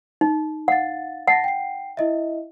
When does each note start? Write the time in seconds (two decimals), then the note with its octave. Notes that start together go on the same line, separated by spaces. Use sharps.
0.21 D#4
0.68 F5 F#5 A6
1.28 F#5 A5 A6 A#6
1.44 G5 C7
1.97 E4 D#5 E5